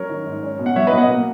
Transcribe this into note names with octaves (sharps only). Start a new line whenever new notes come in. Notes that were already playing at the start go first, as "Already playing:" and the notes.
Already playing: F#3 C#4 A#4 C#5
D#3
G#2
C#4
B2
F#5
F#3 C#5 E5
B4 D#5
B2
D#5 F#5
A#3